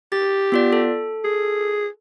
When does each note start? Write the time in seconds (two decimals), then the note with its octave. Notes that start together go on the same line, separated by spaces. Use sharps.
0.12 G4 A6
0.52 B3 F4 D5
0.73 A4
1.24 G#4